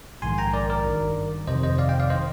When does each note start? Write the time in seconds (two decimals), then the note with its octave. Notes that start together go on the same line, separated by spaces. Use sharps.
0.22 A#1 G#2 D#3 G#5 C6
0.38 G5 A#5
0.53 A#4 D5
0.70 A#4 D5
0.85 G#1 G2 D#3
1.47 G1 F2 C3 D#3 C5 D#5
1.63 C5 D#5
1.78 D5 F5
1.89 D#5 G5
2.00 D5 F5
2.10 D#3 C5 D#5